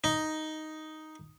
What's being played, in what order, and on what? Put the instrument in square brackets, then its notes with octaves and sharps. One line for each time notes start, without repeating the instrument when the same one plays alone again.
[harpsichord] D#4